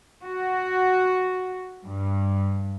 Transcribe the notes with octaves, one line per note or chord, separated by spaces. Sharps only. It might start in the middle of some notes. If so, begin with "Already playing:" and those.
F#4
G2